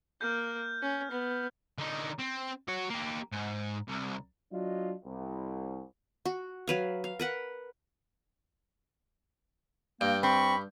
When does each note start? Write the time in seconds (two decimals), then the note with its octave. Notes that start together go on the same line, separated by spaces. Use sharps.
0.21 A#3 F6 G6
0.82 C#4
1.11 B3
1.78 D3 D#4
2.19 C4
2.68 F#4 C#5
2.90 A#3 G4
3.32 G#2
3.88 C2
4.52 F#3 D4 F4 D#5
5.03 C2
6.25 F#4
6.68 F#3 B4 F5
7.04 F5
7.19 A#4 B4 F#5
10.01 G2 A#3 G5
10.23 C4 B5 C#6